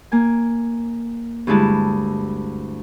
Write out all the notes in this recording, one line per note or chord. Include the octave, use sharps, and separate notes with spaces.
A#3 G#5
D2 G2 G#3 E4 A5